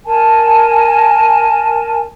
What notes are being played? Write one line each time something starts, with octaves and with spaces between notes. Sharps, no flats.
A#4 G#5 A5